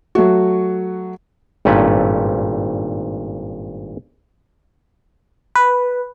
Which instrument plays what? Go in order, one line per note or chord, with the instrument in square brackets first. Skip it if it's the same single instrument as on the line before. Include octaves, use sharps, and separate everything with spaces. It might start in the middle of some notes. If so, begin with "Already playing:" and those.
[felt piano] F#3 A3 F#4
[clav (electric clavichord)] G#1 G2 A#2 A3 C#4 B4
[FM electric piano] B4